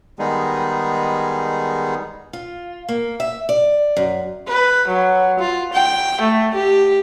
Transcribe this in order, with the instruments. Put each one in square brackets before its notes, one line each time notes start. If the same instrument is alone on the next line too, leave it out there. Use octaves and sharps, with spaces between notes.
[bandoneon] D#3 G3 G#3 B3 D#4 G#4
[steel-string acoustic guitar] F4
A#3
E5
D5
F#2
[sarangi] B4
F#3
F4
G5
A3
G4